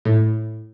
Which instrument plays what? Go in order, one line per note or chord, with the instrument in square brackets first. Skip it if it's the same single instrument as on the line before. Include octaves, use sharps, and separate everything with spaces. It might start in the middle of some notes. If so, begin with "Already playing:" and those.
[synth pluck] A2